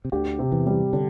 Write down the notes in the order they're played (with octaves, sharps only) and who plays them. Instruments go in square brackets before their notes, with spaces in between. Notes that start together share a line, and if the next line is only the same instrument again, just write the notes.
[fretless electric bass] C3
[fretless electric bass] D2 D3 [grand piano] G4
[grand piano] C3
[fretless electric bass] E2 E3
[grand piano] G3
[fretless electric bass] D3 [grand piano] D4